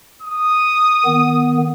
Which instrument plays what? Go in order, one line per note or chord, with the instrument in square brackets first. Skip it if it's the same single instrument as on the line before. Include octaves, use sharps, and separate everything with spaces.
[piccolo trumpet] D#6
[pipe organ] D#3 B3